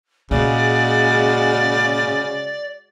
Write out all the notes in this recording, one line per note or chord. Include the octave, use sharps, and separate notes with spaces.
A#2 C#3 G#3 F#4 D5